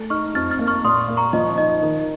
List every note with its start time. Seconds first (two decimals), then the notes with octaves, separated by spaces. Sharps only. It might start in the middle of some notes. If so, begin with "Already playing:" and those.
Already playing: A3
0.10 D#4 C#6 F6
0.35 F2 F6 A6
0.51 F6 A6
0.59 A#3
0.67 C#6 F6
0.84 A#2 C6 D#6
1.08 A#3
1.17 A#5 C#6
1.33 F3 D#5
1.58 D#4 D#5
1.82 D#3